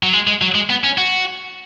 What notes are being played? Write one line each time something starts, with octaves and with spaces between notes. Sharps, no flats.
F#3
G#3
G#3
F#3
G#3
B3
C#4
F#4